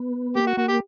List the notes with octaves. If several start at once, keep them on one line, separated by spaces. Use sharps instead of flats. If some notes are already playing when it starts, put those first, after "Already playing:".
Already playing: B3
A#3 G4
F#4
A#3 F#4
G4